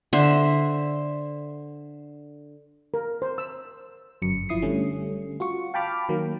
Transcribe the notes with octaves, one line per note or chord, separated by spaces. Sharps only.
D3 C5 E5
A#4
C5
E6
G1 F#2 C#7
G1 F3 E4 D#6 C7
D3 G3 A3 C#4
F4 F#4 C#6
F5 G5 A5 B5 D6 F6
D#3 F#3 A#3